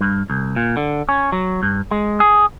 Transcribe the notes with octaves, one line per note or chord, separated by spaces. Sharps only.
G2
C2
A#2
D3
C#4
F#3
G2
G#3
G#4